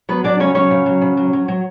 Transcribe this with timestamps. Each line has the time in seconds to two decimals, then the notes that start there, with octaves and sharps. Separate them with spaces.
0.09 F#3 B3 B4
0.24 F#3 D4 D5
0.40 C#3 C#4 C#5
0.55 F#3 C#4 C#5
0.71 C#3
0.86 F#3
1.01 C#3
1.17 F#3
1.33 F#3
1.48 F#3